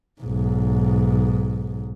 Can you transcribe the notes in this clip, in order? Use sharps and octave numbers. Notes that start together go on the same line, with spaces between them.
B1 G#2